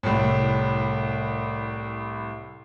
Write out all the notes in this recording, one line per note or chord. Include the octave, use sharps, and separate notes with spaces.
C2 A2